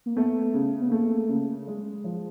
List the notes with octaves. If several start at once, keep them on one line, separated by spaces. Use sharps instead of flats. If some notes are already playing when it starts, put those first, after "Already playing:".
A#3
A3 B3
C#3
B3
A3 A#3
C#3
G#3
F3